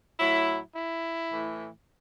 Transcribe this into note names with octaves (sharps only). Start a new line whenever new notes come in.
A2 F#3 E4
E4
A2 E3